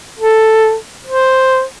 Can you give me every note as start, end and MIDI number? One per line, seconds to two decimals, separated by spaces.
0.19 0.75 69
1.06 1.63 72